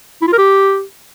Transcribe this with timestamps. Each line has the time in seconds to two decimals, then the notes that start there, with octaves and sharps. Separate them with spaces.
0.22 E4
0.27 F4
0.33 A#4
0.38 G4